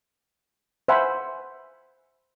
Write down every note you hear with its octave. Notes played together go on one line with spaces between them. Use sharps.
C5 E5 F#5 G#5 B5